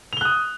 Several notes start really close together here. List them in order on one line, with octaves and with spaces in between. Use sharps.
F7 G7 F#6 D#6